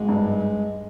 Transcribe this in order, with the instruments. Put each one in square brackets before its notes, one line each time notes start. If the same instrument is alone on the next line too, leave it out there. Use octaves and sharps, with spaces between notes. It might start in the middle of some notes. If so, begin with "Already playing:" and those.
Already playing: [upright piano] G#1 [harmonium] G#3
[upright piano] G2